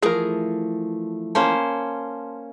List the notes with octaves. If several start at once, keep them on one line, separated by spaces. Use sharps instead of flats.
E3 F3 A3 G#4 A#4
A#3 C#4 C5 A5 C6